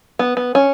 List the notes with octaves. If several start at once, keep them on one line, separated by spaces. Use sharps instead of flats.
B3
B3
C#4